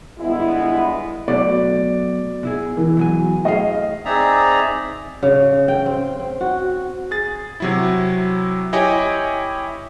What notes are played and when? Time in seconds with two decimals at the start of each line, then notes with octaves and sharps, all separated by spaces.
0.19 G1 G#3 B3 E4
1.28 B2 F#3 A3 D5
2.43 B2 E4 G#4
2.77 E3
2.97 B2 F#3 G#5
3.45 A3 G#4 D#5 F5
4.05 C4 D#4 G#4 D5 E5 A#5
5.23 C#3
5.68 G5
5.86 C4
6.19 C4
6.41 F#4
7.11 G#4 A6
7.60 C3 F#3 E4
8.73 E4 G4 C#5 D#5 G5 G#5